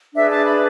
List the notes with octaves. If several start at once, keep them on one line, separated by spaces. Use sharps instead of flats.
D4 G#4 B4 E5
A5
B5